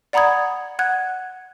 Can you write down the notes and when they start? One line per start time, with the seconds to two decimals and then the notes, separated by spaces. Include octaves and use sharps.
0.13 D5 F#5 A#5 B5 D#6 G#6
0.79 F#5 F#6 G#6